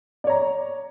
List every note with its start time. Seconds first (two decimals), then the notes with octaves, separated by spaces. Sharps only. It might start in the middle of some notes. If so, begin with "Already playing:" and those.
0.24 D5
0.27 C#5
0.30 A#5